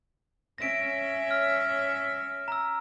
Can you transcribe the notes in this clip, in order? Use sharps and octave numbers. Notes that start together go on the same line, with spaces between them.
C#4 E5 A#6 D7
F6
A#5 E6